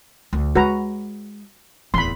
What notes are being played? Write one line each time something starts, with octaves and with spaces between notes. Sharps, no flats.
D2
G#3 F#4 B4 A#5
D1 E2 B5 C6